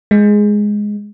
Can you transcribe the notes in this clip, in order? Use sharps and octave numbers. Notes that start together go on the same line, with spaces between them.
G#3